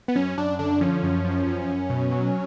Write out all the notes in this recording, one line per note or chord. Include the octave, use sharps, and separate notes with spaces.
B3
F#2 C#4
F#2 D4
D3 D4
F3 C#4
F#2
F3
F#2
F#2
B2
F#3